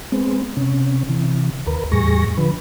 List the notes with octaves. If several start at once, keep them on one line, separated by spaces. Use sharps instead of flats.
G#3 B3 C4
C3 C#4
C3 E3
D#2 A#4 B4
E2 A2 G3 G#4 C#6 A#6
D3 F3 B4